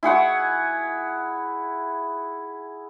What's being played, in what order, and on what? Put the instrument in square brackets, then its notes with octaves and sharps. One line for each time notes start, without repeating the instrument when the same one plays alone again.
[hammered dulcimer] E4 G#4 F#5 C#6